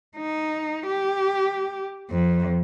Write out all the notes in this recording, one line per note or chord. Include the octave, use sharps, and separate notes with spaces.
D#4
G4
F2